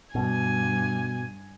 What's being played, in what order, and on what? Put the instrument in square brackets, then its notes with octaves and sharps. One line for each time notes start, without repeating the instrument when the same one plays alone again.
[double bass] G2 [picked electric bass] B2 [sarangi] G#5